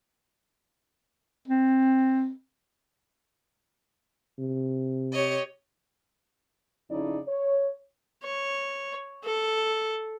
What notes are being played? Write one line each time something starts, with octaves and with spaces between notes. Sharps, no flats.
C4
C3
G4 C#5 D#5
F2 C#3 C#4 D#4 E4 D5
C#5
C#5
A4